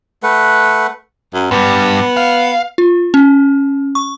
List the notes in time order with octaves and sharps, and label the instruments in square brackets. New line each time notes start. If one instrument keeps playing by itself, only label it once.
[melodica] A3 B4 F#5
[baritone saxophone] F#2
[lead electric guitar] G2 G3 [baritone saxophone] B3
[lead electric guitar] F5
[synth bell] F4
C#4
C#6